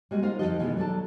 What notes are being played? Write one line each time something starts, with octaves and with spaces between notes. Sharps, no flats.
G3 G#3 A#3 F#4
D#4 F4 A#4 C5
F2 E3 F3 F#4 A4 D#5
B2 D#3 E3 G#3
F#3 D4 A4 A5